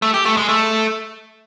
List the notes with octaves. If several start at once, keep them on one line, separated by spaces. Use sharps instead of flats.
A3
G4
A3
G#3
A3